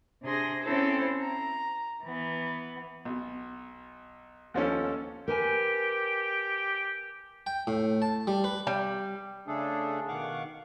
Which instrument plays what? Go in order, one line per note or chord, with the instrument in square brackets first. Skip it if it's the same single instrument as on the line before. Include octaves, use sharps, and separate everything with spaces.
[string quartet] C3 D4 G#4 C6 A#6
C4 C#4 E4 A4 C5
A#5
E3 B3
[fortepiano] B1 B2
D#2 F3 B3 C#4 A4
[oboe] G4 [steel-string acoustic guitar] A#4 B4 G#5
[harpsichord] G5
A2
A5
G3
B4
[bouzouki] G3
[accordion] C#3 A3 D4 G#4 A4
B2 D#3 F5 F#5 C#6 D6